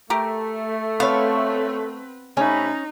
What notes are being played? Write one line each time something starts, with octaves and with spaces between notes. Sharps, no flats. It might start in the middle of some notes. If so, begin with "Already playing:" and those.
A3 G4 A#4
B3 C4 A4 B4 C#5 F5
C3 A3 C#4 D#4 B5